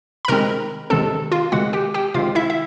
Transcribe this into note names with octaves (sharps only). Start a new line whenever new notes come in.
B5
C3 D#3 G#3 C4 A#4 A#5
C3 D#3 G#3 C4 A4 A5
F4 F5
C3 D#3 G#3 C4 F#4 F#5
G4 G5
G4 G5
C3 D#3 G#3 C4 F4 F5
E4 E5
E5